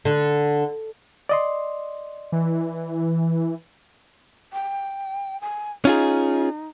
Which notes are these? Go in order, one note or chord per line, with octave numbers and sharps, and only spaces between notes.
D3
D5 D#5 C6
E3
G5
G#5
C#4 D#4 F4 G#4